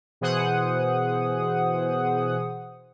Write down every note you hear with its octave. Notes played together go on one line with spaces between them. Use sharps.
B2 E3 G#4 C5 F#5 D#6